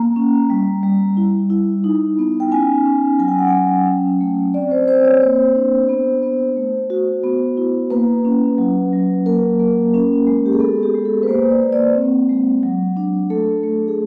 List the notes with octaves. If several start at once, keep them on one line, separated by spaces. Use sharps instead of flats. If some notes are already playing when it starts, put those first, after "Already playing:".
Already playing: A#3 A#5
C#4
G3
G3
E4
E4
D#4
B3
G5
C#4 G#5
C#4
F#3 G#5
G5
F#5
F#3 G5
C#4
A3
C4 D5
C5
C4 C5
C#5
A#3 C5
D4
B3
B3
A3
F#4
B3
E4
A#3 B4
C#4
F#3
F#3
A#3 A#4
A#3
C#4
G#3
G4
G#4
B3 A4
G4
G#3
A4
B4
A#3 C5
D5
A#3
D5
C4
G#3
F#3
D4
A3 A4
A3
G#4